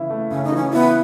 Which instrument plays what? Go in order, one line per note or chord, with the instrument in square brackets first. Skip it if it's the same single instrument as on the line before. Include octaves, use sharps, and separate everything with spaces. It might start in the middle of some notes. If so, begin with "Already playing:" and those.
Already playing: [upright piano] C#3 E3 E4
A3
[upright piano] C#3 [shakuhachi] C#4
[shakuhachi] D#4
[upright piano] E3 [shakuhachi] C#4
[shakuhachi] B3 [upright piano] E4